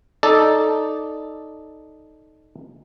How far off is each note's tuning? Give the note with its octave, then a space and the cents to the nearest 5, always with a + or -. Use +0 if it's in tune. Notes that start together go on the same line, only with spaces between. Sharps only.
D#4 +0 A4 -5 D5 +0